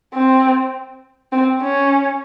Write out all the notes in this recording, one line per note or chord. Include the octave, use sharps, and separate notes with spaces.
C4
C4
C#4